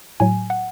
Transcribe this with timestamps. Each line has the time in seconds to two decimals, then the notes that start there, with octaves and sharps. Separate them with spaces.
0.20 A2 F#3 G#5
0.50 F#5